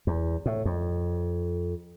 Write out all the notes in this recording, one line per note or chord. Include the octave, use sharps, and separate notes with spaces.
E2
A2
F2